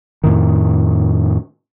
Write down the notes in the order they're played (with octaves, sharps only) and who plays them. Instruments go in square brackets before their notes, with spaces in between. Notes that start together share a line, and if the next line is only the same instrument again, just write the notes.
[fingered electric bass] F2 A2 D#3